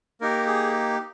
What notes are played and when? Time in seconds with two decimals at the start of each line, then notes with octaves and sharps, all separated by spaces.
0.21 A#3 D#4 G4 A#4
0.47 G#4